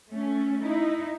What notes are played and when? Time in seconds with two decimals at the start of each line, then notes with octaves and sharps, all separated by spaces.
0.11 A3 C#4
0.61 D#4 E4